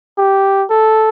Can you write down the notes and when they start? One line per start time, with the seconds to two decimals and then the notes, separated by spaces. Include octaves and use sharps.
0.18 G4
0.70 A4